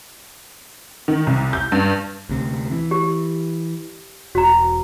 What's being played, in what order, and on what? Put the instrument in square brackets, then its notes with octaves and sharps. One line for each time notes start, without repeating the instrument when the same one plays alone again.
[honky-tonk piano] D#3
C2
G6
G2
[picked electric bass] D2 C3
E3
[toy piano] G4
[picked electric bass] E1 [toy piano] F#4 A#5